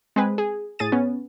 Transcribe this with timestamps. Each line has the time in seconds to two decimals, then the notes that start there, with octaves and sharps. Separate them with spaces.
0.16 G#3 C4 G#4 B4
0.38 G#4
0.79 A2 G#4 A6 D#7
0.92 B3 C#4